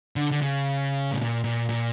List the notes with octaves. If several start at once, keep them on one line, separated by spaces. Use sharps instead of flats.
D3
D3
C#3
A2
A#2
A#2
A#2